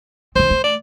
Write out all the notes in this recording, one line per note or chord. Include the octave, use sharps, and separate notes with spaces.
E3 C4 C5
A3
D5